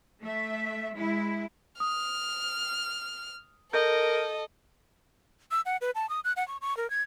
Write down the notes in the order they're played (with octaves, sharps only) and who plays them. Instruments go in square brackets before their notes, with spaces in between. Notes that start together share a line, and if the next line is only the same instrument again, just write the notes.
[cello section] A3 E5
G#3 E4
[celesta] D#6 [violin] F6
[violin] A4 [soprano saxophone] A#4 [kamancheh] D#5 [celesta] G6
[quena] E6
F#5
B4
A5
D#6
F#6
F#5
C#6
C#6
A#4
G#6